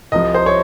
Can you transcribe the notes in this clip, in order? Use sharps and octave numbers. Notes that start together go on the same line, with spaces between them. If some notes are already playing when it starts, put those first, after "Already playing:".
C2 C3 F3 D#5
C5
C#5